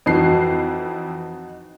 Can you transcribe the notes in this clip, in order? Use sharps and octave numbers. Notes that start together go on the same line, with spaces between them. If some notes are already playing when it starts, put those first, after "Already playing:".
F2 E3 D#4 F#4 C7